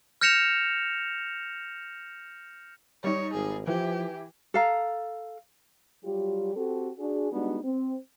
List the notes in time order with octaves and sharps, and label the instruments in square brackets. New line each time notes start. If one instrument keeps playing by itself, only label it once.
[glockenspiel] F6 G6 A#6 C#7 E7 F7
[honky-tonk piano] G3 D#4 [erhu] C#5
[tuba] G#1 [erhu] G#4
[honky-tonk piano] E3 [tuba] F3 [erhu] G4
[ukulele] A4 F5 A#5
[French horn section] F#3 G3 F4 G4
C4 F#4 G4 A4
D4 F#4 G#4
G3 G#3 B3 D4 D#4 F#4
C4